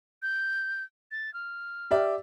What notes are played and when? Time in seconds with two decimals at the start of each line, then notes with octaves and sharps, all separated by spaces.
0.22 G6
1.12 A6
1.34 F6
1.91 G4 D5 E5